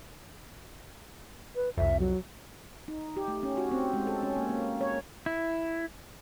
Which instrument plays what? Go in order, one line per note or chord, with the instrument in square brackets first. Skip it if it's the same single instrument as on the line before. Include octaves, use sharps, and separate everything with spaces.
[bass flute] B4
[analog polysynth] C2 F2 [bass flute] E5
[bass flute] F#3
[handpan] D#4
G4
A3
C#4
F#4
C4
G#3
A4
C#4
A#3
A#3
C#5
[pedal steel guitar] E4